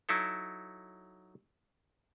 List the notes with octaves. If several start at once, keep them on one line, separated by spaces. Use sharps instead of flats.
F#3 D#4 E4 A4